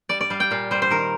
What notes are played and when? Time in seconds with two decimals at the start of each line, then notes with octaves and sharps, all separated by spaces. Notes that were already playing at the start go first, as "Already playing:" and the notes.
0.09 G3 D5
0.21 D5
0.30 G3 F5
0.40 G5
0.51 A#2 F5
0.71 G3 C5
0.82 C5
0.90 D#3 A#4